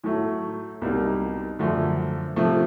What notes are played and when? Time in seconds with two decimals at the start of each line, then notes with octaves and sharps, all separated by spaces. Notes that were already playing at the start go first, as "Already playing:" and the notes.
0.04 A2 F#3 A3
0.82 C2 B2 G3 A#3 D#4
1.59 F#2 D3 F3 A3
2.36 C3 F3 A3